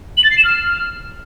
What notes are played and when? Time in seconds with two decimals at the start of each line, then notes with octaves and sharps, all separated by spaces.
0.17 F#7
0.24 A6
0.31 C7
0.38 E7
0.44 F6